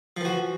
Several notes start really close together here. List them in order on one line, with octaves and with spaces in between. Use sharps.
F3 E3 F#4